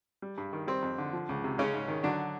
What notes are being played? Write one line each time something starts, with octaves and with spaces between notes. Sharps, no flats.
G3
G2
D#3
G3 C4
F2
D3
F3
C#2
C3
C#3 G#3 C#4
G#2
D#3
D3 F#3 D4